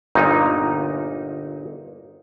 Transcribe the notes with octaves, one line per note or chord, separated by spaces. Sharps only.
G1 A#2 D#4